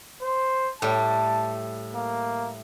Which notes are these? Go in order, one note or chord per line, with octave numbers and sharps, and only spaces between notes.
C5
A2 G3 A5
A#3